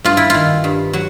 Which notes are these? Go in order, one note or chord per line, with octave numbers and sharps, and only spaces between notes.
G2 F4
E4
D#3 F4
G2
F#3 F#4